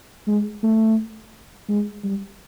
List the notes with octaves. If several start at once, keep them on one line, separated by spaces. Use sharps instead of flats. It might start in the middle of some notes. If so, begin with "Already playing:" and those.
G#3
A3
G#3
G3